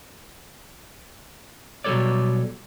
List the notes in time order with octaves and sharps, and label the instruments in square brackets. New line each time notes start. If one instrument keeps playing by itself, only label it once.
[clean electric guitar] B2 F#3 G3 A4 C#5 D5